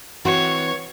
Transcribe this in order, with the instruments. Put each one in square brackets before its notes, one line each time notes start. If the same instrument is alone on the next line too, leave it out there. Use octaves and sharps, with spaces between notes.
[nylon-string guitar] E3 C4 F#4 [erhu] C#5